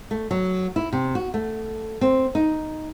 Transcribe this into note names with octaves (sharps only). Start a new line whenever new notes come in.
A3
F#3
E4
C3
F#4
A3
C4
D#4